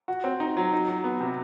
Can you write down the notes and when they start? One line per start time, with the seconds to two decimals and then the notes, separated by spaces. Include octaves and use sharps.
0.08 F#4
0.24 C4
0.40 D#4
0.57 F#3
0.73 D#4
0.88 F#3
1.04 B3
1.20 C3